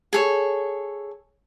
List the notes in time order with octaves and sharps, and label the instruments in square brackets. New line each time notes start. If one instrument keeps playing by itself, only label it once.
[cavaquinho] G#4 A4 C#5